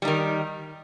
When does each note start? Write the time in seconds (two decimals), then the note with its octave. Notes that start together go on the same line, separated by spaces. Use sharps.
0.02 G3
0.05 D#4
0.08 D#3